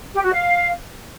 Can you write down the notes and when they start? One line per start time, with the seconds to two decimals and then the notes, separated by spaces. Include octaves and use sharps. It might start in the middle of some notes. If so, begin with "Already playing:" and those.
0.14 G4
0.23 F#4
0.32 F5